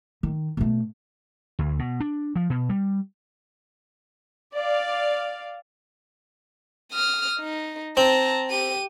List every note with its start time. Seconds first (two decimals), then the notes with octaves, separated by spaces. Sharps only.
0.23 D#3
0.57 B2 A3
1.59 D2
1.79 B2
2.00 D4
2.36 F3
2.50 B2
2.70 G3
4.54 D5 F5
6.92 D#6 F6
7.39 D#4
7.97 C4 A5 A#5
8.49 G4 D#7